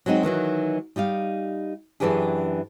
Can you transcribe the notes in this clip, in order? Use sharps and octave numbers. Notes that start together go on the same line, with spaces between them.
F#3 G#3 C4 D#4 F#4
D#3 E3 F#3 D#4
G3 D#4 G4 F5
F#2 D#3 E3 D4 G4 G#4